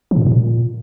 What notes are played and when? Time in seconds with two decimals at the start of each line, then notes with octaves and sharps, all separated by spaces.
0.11 F3
0.16 A#2
0.21 A2
0.27 B2
0.32 A#2